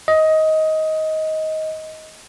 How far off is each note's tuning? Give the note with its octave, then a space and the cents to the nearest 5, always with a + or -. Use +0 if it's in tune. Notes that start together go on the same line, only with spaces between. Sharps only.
D#5 +15